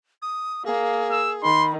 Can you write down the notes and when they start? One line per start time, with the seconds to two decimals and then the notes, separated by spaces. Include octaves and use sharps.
0.22 D#6
0.66 A#3 G#4
1.11 E6
1.44 D#3 B5 C6